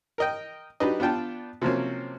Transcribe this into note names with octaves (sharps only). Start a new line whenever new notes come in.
A#4 D#5 G5
F#3 D4 D#4 G4 B4 D#5
B3 D4 F4 G5 A5
C3 F3 F#3 A#3 C4 C#4